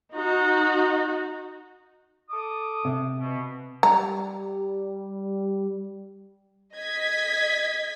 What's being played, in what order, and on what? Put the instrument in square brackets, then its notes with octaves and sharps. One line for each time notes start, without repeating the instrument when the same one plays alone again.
[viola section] D#4 F#4
[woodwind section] A4 D6 D#6
[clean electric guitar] C3
[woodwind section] B2
[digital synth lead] G3 [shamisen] A#5
[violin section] D#5 G#6 B6